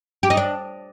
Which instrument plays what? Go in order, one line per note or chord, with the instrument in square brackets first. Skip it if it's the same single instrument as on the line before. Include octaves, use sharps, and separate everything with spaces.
[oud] G4
D#4
D4